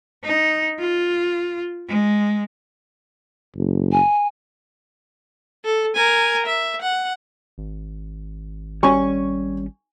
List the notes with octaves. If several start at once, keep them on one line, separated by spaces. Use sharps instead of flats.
D#4
F4
G#3
F#1
G#5
A4
A#4 G#5
E5
F#5
G#1
G3 C#4 G#5 C#6